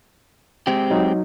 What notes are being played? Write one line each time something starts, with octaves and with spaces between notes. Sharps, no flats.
G#3 C4 G4
F#3 D#4